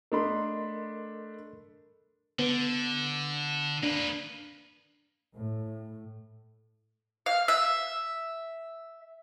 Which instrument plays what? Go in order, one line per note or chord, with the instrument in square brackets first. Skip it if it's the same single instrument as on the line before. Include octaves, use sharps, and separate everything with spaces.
[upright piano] A3 D4 B5 [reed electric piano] A#4 D#5 C6
[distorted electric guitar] D3 [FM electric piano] B3
[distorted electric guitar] A#3 B4 [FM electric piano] D4
[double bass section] A2
[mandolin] F5
E5